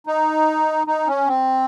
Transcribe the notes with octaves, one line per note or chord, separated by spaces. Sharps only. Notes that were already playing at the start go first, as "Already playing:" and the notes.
D#4
D#4
C#4
C4